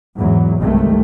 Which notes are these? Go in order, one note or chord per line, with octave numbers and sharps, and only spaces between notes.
E2 G#2 E3 F#3
G1 C2 C3 D#3 G#3 A3